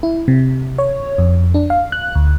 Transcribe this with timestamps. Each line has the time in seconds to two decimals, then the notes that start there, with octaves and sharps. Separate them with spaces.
0.03 E4
0.28 C3
0.78 C#5
1.18 F2
1.54 D4
1.70 F5
1.92 F#6
2.15 D2